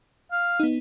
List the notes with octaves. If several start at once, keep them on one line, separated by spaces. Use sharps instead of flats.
F5
B3 D#4